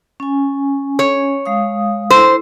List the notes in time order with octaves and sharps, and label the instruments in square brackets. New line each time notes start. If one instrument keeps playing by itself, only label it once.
[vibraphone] C#4 G#5
[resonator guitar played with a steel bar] C#5
[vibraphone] G#3 F5 D#6
[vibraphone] E4 A4 E6 [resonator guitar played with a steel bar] C5